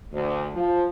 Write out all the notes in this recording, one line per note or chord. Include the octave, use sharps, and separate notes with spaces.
D2
F3